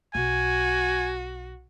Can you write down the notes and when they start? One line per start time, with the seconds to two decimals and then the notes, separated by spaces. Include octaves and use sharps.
0.15 B1 F#4 G#5